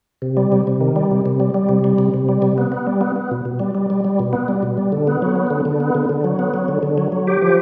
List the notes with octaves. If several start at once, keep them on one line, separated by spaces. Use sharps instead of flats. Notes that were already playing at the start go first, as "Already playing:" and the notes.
C3
G3
C3
C3
D#3
G3
C3
C3
G3
G3
C3
G3
C3
C3
G3
C3
B3
B3
G3
B3
B3
B2
B2
G3
G3
G3
G3
B2
B3
G3
B2
G3
D3
B3
F#3
B3
D3
D3
B3
D3
D3
F#3
B3
F#3
D3
D3
F#3
F#3
G4
F3